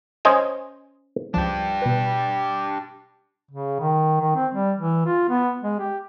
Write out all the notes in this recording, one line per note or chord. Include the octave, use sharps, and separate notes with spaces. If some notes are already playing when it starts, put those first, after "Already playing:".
C#4 C5 D#5 G#5
C#2 F3 D4 G4
B2 B4
C#3
D#3
D#3
C4
G3
E3
F4
B3
G#3
G4